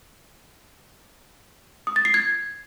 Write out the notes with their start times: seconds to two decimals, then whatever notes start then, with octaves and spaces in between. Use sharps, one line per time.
1.87 D#6
1.96 A6
2.05 C7
2.14 G#6